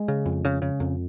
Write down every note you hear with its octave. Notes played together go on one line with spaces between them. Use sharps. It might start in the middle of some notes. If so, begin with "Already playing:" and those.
Already playing: G#3
C#3
F2
C#3
C#3
F2